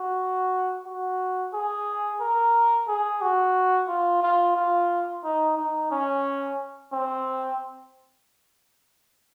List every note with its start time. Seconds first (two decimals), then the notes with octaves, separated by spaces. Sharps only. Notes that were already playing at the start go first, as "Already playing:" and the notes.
Already playing: F#4
0.86 F#4
1.53 G#4
2.20 A#4
2.88 G#4
3.22 F#4
3.88 F4
4.23 F4
4.56 F4
5.24 D#4
5.57 D#4
5.91 C#4
6.92 C4